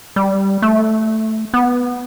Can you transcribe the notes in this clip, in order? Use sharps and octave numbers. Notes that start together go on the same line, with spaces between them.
G3
A3
B3